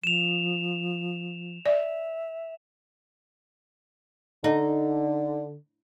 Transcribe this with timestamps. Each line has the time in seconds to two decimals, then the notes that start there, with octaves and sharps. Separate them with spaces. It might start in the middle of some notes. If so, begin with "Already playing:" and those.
0.04 F3 E7 F7
1.66 D5 E5
4.44 D3 D#4